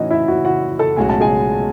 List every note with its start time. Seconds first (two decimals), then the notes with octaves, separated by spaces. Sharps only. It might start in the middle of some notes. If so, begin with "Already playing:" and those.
Already playing: A2 E3 A3 C#4 D#4 F#4 D#5
0.11 E4 E5
0.28 F#4 F#5
0.45 F#4 F#5
0.79 A4 A5
0.96 B1 A2 G#3 C#4 F#4 G#5
1.09 A5
1.21 G#4 G#5